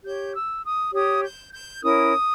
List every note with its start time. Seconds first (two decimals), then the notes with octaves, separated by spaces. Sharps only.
0.04 G4 C#5 G6
0.33 E6
0.64 D#6
0.93 G4 C#5 D#6
1.22 G6
1.52 G6
1.82 C#4 E4 A#4 C#5 D#6